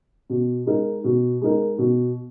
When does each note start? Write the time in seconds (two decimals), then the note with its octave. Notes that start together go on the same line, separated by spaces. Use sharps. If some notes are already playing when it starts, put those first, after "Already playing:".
0.30 B2
0.66 G#3 D#4 A#4
1.04 B2
1.41 G#3 D#4 A#4
1.78 B2